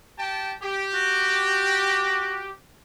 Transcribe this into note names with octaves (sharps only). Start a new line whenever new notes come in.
G4 G5 A5
G4
F#4